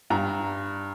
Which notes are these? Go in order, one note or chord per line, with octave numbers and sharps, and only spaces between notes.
G2 A#5